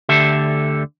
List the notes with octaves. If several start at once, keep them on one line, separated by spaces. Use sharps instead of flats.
D2 D3 G4 A4 E5